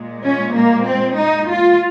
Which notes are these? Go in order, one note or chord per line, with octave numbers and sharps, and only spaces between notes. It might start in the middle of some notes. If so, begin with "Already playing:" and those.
Already playing: A#2 G#3
C#4
A#3
C4
D#4
F4